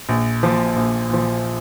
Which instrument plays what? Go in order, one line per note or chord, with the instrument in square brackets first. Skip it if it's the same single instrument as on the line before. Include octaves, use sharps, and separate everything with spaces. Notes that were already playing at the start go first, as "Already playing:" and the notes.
[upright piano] A#1
A#2 F3
A#1
A#2 F3